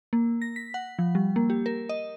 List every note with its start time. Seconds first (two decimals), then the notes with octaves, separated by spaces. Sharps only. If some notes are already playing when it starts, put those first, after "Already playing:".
0.13 A#3
0.42 A#6
0.56 B6
0.74 F#5
0.99 F3
1.15 G3
1.36 A#3
1.50 G4
1.66 A#4
1.89 D#5